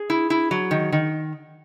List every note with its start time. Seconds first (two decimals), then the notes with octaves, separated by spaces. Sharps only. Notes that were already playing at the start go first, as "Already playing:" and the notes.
Already playing: G#4
0.10 E4
0.30 E4
0.51 F#3
0.71 D#3
0.92 D#3